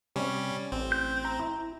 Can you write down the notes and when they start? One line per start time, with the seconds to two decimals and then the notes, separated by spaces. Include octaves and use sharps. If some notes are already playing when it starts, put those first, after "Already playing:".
0.16 C3 G3 C#4
0.72 A1 C4
0.92 G6
1.25 A#5
1.39 E4